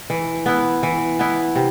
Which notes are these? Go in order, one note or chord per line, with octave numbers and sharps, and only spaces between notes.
E3
B3 E4
E3
B3 E4
C3